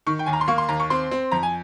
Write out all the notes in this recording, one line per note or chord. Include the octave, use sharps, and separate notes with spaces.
D#3 C#6
G5
D#2 G#5
A#5
C6
A#3 C#6
C6
D#2 A#5
C#6
C4 C6
C4
F2 A#5
G#5